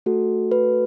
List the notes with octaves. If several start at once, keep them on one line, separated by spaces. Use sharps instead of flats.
A3 F#4 A4
B4